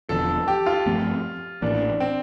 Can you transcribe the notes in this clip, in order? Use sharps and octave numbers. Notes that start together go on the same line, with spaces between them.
E1 E2 D3 F3 A4
G4
F4
G2 F3 A3 C4
A1 A2 E3 A#3 D4
C4